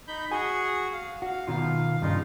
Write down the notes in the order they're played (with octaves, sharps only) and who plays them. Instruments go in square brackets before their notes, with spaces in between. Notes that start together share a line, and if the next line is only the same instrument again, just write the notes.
[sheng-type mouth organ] D#4 B5 G6
[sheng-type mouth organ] F#4 G#4 [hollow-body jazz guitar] G#5
[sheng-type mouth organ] F5
[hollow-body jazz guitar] F#4
B2 D#3 F4
[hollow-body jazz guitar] G2 C#3 [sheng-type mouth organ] D#4 F4